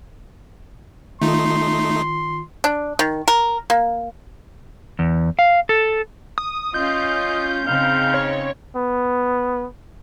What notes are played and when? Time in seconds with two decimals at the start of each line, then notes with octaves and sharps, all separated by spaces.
1.22 D#3 A3 D#4 F4 C6
2.64 D4
2.99 D#3
3.28 A#4
3.70 A#3
4.99 E2
5.39 F5
5.69 A4
6.38 D#6
6.74 C#4 F4 D#5 G6
7.67 C#3 C4 D#4 F5
8.14 C#5
8.75 B3